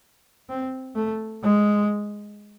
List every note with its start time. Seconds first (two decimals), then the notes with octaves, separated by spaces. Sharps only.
0.49 C4
0.95 A3
1.43 G#3